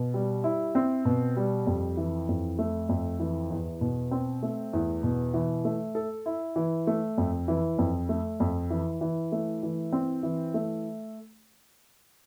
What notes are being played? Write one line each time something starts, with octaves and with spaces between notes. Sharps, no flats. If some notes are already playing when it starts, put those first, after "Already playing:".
Already playing: B2
G3
E4
C4
B2
G3
F2
E3
F2
A3
F2
E3
E2
B2
C4
A3
E2
B2
E3
A3
A4
E4
E3
A3
F2
E3
F2
A3
F2
E3
E3
A3
E3
C4
E3
A3